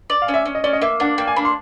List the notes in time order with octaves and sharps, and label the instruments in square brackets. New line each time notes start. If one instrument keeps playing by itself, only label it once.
[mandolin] D5
[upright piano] F5
[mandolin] C#4
[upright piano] E5
[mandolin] C#4
[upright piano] D#5
[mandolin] C#4 [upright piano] D5
[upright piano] D#5
[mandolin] A#3 [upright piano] E5
[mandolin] D4 [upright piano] F#5
[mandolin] A#3 [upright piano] G5
[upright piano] G#5
[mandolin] D4 [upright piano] B5
[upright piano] C6